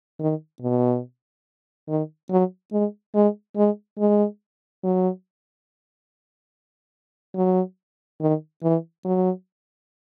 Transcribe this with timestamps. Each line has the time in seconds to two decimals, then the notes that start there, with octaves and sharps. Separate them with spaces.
0.20 D#3
0.62 B2
1.89 D#3
2.30 F#3
2.73 G#3
3.15 G#3
3.56 G#3
3.99 G#3
4.84 F#3
7.36 F#3
8.21 D#3
8.63 E3
9.05 F#3